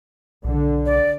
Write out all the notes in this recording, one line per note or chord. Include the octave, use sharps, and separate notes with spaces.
B1 D3
D5